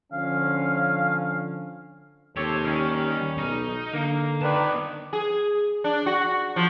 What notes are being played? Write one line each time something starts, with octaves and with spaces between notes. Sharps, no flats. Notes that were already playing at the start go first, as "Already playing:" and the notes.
D3 F3 C#4 F5
D#2 C4 G4 A4 C#5
D#3 G3 C#4
B1 D#4
D3 A#3
D#3 C4 D4 B4 A5
G#4
D4
F#4
F3